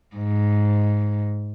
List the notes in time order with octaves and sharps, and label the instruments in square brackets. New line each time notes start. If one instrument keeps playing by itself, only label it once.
[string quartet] G#2